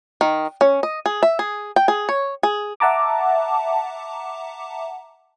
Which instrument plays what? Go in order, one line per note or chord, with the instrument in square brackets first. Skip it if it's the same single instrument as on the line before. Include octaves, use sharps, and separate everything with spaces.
[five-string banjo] D#3
C#4
D#5
G#4
E5
G#4
G5
G#4
C#5
G#4
[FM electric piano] E5 F#5 A5 A#5 D6